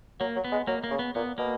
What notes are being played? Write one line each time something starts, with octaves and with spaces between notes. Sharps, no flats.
F#3 A#3
F#3
B3
G#3
F#3 A#3
A#3
C#3
B3
A#2 B3
B2 A#3